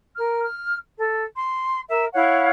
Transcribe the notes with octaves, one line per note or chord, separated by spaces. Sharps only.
A#4 F6
F6
A4
C6
A#4 E5
E4 C#5 F5 F#5